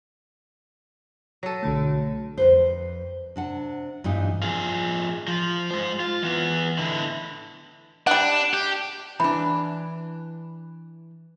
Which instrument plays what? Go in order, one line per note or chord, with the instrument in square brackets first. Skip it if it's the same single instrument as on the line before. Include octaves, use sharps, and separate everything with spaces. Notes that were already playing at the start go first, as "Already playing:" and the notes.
[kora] F#3 A4 [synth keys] A#6 D#7
[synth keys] B1 D3 A3
[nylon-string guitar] F2 B4 C5
C3 D4 F#5
G2 A#2 E3 D#4
[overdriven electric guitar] F3 G#4
F3
G#3 C5
F4
E3 B3
D3 E4
[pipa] G3 F#5 [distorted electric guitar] D4
[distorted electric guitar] G4
[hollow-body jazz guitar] E3 D4 [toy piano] B5